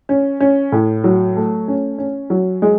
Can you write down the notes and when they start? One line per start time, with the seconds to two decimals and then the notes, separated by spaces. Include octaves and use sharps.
0.09 C#4
0.40 C#4
0.72 A2
1.04 F#3
1.36 A3
1.68 C#4
1.98 C#4
2.30 F#3
2.62 G#3